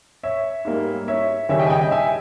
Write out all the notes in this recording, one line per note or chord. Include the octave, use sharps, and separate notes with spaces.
C#5 E5
G#2 G3 A#3
C#5 E5
D#2 C#3 G3 C#5 E5
D#5 G5
G#5
D#5 G5
D#5 G5
E5 G#5